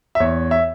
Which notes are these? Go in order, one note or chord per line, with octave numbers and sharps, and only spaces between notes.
E5
E2 C#5
E5